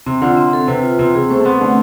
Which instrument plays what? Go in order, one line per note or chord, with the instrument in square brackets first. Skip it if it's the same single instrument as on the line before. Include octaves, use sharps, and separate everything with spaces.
[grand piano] C3 [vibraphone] C4
[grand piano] D3 [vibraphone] F4
[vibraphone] C4
A4
[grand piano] C3 [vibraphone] B4
[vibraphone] F4
[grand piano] C3 [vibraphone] C4
[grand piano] C3 [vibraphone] G#4
[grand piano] A3 [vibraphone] C5
[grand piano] A3
[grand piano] B3 [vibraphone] C4
[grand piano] D3 [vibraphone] A3